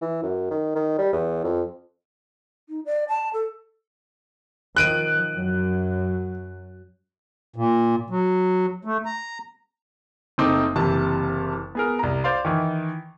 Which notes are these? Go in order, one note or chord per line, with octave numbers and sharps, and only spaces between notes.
E3
F#2
D#3
D#3
G3
E2
F2
D#4
D5
A5
A4
D#3 F3 F#6 D7 D#7
F#2 F#3
A#2
F#3
A3
A#5
F#1 A3 C4 D#4 D6
F#1 C3 E3 A5
B3 G#4 A#4
C2 A#5
C5 D5 F5 C6
D#3 E3